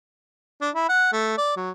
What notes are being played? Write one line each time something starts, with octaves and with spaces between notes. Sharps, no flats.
D4
E4
F#5
A3
D5
F#3